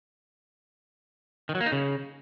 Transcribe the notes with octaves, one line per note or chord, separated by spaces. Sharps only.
D#3
F#3
A#3
D#4
C#3